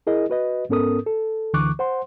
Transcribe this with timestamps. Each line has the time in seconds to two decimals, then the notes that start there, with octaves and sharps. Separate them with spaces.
0.07 E4 G#4 A#4 D#5
0.30 F#4 B4 D#5
0.69 G#2 B3 C#4 A4 A#4 D#6
1.06 A4
1.54 D2 D3 E3 C#6 D6 F#6
1.79 C5 F#5 C6